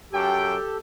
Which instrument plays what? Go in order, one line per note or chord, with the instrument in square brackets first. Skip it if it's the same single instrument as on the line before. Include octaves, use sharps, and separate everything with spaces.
[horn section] F#2 G5 [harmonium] G4 A4